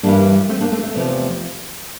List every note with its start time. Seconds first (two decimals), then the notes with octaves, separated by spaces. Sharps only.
0.03 G2 E3 G3 A#3 D4
0.49 A3 C4
0.61 A#3 D4
0.72 A3 C4
0.83 A3
0.94 E2 C3 F3